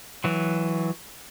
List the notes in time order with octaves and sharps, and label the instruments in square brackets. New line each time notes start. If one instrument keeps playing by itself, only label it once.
[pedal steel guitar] E3 F#3